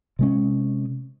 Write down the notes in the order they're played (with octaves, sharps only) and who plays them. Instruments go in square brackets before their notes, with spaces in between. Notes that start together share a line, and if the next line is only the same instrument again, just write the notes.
[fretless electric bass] C3 G#3 C#4